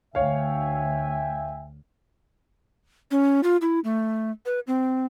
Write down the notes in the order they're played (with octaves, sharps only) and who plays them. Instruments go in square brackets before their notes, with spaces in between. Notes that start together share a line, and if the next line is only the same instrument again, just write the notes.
[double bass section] D2 [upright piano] C#5 F5 [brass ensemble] E5 G5 G#5
[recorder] C#4
F4
E4
A3
B4
C4